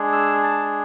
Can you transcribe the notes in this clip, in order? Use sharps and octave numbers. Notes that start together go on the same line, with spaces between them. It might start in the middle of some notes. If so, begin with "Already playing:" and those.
Already playing: G#3 D4 G#4
E6
A5